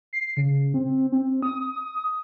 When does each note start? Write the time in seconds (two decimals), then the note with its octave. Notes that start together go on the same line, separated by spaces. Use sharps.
0.13 C7
0.37 C#3
0.74 C4
1.12 C4
1.43 D#6